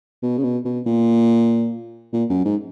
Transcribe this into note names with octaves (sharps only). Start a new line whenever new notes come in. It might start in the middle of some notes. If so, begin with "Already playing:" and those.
B2
C#3
B2
B2
A#2
A#2
F#2
G#2